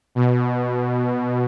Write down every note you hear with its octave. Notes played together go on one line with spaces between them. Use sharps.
B2